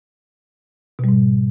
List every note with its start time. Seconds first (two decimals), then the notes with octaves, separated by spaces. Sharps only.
0.99 B2
1.04 G3
1.09 G#2